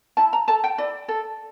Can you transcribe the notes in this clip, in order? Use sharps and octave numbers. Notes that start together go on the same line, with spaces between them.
E4 A5
A#5
A4 A5
G5
E4 D5
A4